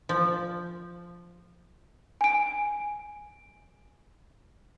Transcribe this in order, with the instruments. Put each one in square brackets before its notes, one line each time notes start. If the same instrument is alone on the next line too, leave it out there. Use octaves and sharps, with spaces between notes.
[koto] F3
[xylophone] G#5 D7